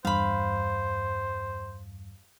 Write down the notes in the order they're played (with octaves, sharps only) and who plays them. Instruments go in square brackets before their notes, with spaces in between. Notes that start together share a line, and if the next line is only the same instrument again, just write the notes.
[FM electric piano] E2 G2 [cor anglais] C5 [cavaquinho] F5 B5